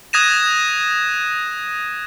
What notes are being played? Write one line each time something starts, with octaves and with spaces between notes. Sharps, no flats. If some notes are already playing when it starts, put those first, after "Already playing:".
D#6 F#6 G#6 A#6 D#7 E7